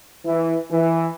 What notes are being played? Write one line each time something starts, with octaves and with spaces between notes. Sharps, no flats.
E3
E3